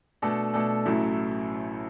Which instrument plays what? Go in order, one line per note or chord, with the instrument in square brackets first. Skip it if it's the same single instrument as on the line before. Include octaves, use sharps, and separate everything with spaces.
[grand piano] B2 A3 D4 A4
B2 A3 D4 A4
A1 A2 F#3 A3 E4